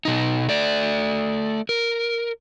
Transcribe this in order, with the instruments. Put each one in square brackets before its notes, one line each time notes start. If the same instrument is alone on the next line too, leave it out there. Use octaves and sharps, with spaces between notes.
[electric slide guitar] B2 D#4
A3 D5
A#4